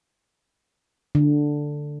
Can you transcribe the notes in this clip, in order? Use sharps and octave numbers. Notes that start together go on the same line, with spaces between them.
D3